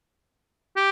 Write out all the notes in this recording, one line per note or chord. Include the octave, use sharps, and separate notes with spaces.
G4